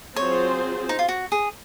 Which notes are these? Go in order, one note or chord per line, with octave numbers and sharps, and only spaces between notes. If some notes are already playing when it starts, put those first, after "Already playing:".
F#3 C4 F4 G#4 C5 C#5
D#4
F4
F#4
G#4